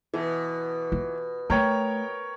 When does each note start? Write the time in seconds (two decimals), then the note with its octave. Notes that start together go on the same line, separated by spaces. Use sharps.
0.14 B2 E3
0.92 F4
1.50 A3 A#4 C#5 G5